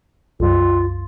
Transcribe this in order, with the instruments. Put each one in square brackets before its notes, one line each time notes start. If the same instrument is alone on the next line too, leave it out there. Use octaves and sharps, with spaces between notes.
[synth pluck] C2 F#2 [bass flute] F4